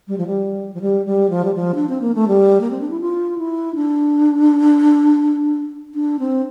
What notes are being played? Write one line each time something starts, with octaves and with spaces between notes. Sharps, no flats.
G3
F3
G3
F3
G3
G3
F3
G3
F3
D4
C4
A#3
A3
G3
A#3
C4
D4
E4
F4
E4
D4
D4
C4